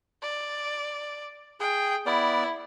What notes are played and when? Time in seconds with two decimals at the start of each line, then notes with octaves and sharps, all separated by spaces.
0.22 D5
1.60 G#4 G5
2.06 B3 E4 D5